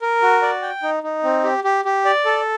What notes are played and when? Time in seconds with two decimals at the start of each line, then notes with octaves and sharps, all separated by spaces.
0.01 A#4
0.22 F#4
0.42 D5
0.62 G5
0.83 D#4
1.03 D#4
1.24 C4
1.44 G4
1.64 G4
1.85 G4
2.05 D5
2.25 A4